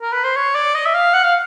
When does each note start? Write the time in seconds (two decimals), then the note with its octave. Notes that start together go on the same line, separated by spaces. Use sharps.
0.01 A#4
0.12 B4
0.24 C5
0.36 C#5
0.55 D5
0.74 D#5
0.86 E5
0.94 F5
1.13 F#5
1.24 F5